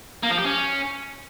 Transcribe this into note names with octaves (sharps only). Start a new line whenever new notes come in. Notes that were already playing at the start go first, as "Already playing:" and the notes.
A#3
F3
G4
C#4